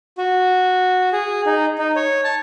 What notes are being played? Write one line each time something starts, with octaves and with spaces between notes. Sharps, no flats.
F#4
G#4
D#4
D#4
C#5
A5